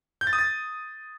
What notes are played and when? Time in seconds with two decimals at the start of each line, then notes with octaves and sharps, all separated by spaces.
0.21 G6
0.27 A6
0.33 D#6
0.39 A6